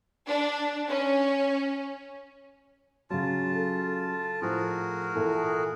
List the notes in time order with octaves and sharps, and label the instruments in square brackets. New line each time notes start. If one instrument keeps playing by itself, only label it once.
[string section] D4
C#4
[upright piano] C#3 F#3 [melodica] F4 A5
[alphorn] A4
[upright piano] A2 F3 [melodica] F#4 G#4 A#4
[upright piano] A#2 E3 E4 [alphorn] A4